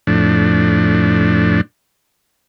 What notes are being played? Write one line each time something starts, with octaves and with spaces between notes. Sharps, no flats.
F2 A2 D4